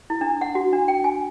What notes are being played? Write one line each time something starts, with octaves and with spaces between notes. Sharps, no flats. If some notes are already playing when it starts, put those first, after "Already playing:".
E4
D4
F#5
F#4
D4
G5
G#5